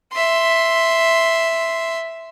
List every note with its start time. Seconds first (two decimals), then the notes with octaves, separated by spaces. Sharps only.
0.13 E5 C6